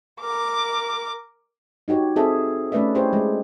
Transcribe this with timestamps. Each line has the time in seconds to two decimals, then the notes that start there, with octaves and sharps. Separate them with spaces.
0.20 A#4 D6
1.88 D#4 F#4 G4 C#5
2.16 C4 G#4 A4 E5
2.72 A3 C#4 B4 D5 E5
2.95 E4 G4 G#4 C5 C#5
3.13 G#3